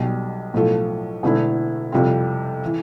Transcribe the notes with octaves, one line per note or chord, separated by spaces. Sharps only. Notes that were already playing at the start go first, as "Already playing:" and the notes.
Already playing: B1 B2 G3
B1 A2 F3 A3
E1 E2 D3 A3 E4
F2 C3 G3 C4 F4
E3